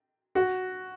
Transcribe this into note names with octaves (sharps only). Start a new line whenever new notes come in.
F#4